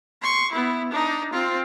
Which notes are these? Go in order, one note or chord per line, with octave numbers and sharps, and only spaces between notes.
C6 C#6
B3 E4
D4 D#4
C4 F4